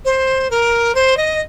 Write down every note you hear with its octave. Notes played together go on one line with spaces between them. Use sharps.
C5
A#4
C5
D#5